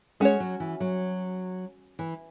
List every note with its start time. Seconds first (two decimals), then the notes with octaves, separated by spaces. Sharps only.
0.20 G#3 C#4 F#4 C#5
0.40 F#3
0.60 E3
0.80 F#3
1.99 E3